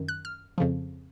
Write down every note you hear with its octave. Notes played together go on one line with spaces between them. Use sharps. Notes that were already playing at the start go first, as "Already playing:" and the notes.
Already playing: F#2 D#3
F#6
F6
F2 C#3 F3